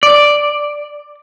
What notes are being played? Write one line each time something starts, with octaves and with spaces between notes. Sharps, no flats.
D5